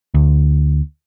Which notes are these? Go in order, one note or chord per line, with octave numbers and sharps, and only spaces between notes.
D2